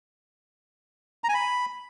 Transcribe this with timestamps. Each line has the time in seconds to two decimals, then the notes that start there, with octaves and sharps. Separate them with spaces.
1.24 A#5
1.29 G#5
1.34 B5